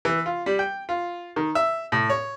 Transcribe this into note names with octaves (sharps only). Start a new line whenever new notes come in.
E3
F4
G3
G5
F4
D#3
E5
A2
C#5